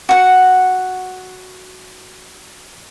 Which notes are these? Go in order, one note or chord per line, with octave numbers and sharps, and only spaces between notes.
F#4 F#5